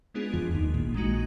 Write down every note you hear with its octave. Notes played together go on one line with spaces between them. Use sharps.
G#3 B3 D4 F4 G#4
F2 F3
D#2 D#3
A#1 A#2
A#1 A#2 D#3 G#3 D#4 F#4